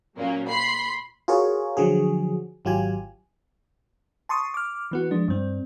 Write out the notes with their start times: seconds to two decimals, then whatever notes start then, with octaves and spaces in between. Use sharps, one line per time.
0.18 A#2 F#3 A#3 C#4
0.49 B5 C6 C7
1.28 F4 F#4 G#4 A#4 C#5
1.77 D3 F3 F#3 F#4 G#4
2.65 G#1 F#3 F4 G4 G#5
4.29 A5 C6 C#6 D#6
4.54 D6 F6
4.91 E3 B3 F#4
5.11 F3 G#3 D4
5.28 G2 C4